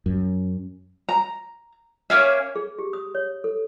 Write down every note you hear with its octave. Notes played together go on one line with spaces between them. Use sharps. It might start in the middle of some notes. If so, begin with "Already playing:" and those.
F#2
A#5
A#3 C#4 G#4 C#5 E5
G#4
G4
D#6
C#5
A4